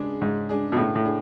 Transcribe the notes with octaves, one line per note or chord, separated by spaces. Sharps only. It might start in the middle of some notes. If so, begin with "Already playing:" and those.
Already playing: C#3 G#3 D4 G#4
G#2 C#3
G#3 D4 G#4
B2
A2 C#3
A2
D4 G#4